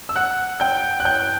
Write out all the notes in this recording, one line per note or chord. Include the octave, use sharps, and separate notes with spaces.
E6
F#5 F#6
G5 G6
F#6
G5 G6